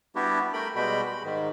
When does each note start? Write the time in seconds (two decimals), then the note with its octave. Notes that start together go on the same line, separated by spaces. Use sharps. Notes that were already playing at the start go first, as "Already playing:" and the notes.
0.15 G3 B3 D4 E4 F#4 G4
0.53 A3 A#4 G5 B5
0.76 B2 G3 G#3 F#4 G5 B5
1.07 B5
1.24 G#2 D#3